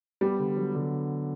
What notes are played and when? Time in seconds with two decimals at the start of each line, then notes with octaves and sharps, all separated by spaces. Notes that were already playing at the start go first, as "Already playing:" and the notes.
0.21 G3 B3
0.39 D3
0.57 F#3
0.75 D3